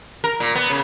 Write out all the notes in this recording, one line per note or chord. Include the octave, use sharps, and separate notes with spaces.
A#4
A#2
B3
C#3